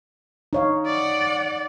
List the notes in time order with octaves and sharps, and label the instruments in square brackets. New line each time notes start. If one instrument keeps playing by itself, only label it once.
[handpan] D#4 C#5 F5
[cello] D5 F#5